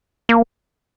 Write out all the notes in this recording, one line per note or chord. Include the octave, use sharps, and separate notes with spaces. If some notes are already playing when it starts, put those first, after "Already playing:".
A#3